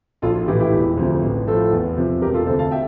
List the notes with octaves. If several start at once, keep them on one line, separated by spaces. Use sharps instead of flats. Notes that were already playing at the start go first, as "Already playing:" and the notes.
A#1 F4 A4
F4
A2 E3 E4 G4
E4 G4
E1
D2 C3 F3
A1
A2 F3 F4 A4
E2
C3 F3
E1 G4 A#4
F4 A4
D2 C3 A4 C5
F5 A5
E5 G5